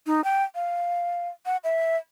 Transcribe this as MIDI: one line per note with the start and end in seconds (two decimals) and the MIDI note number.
0.06 0.23 63
0.24 0.43 79
0.55 1.29 77
1.46 1.57 78
1.64 1.97 76